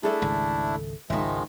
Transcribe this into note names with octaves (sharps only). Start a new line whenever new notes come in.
A3 D4 E4 G#4 A4 E5
G#1 C#2
G#1 C#2 D#3 F3 G#3 D#4 E5